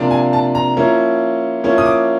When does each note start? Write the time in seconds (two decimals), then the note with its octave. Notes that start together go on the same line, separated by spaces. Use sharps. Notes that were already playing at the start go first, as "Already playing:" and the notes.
Already playing: C3 F3 A#3 D4 F4
0.11 G#5
0.33 A5
0.55 A#5
0.77 F3 A#3 C#4 E4
1.64 F3 A#3 C#4 E4
1.78 D#6
1.86 D6